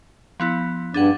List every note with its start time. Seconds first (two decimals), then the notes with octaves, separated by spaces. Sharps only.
0.40 F3 B3 E4
0.94 G2 D4 G#4 F#5